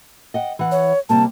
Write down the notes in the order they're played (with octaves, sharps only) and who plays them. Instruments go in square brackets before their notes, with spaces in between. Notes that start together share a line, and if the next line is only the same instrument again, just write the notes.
[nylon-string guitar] D#5 F#5 G5
E3 F#5
[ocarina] C#5
[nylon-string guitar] C3 G3 A#3 [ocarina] A5